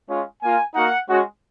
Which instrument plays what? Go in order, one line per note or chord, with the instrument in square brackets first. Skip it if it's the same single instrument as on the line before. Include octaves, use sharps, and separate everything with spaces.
[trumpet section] G#3 C#4 F4
A#3 F4 G#5
A#3 D#4 F#4 F#5
G#3 C#4 F#4